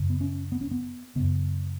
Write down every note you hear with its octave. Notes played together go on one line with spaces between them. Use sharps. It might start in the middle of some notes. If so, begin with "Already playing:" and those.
Already playing: F#2 C#3
B3
C#4
B3
C#4
B3
F#2 C#3 B3